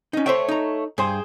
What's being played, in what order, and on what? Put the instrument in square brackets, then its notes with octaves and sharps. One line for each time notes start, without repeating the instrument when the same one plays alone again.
[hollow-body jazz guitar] C#4 D#4
[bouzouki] A3 C#5 [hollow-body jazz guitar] C5 E5 G5
[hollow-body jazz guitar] D#4 A#5
[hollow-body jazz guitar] G2 [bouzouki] G#4 C5 G5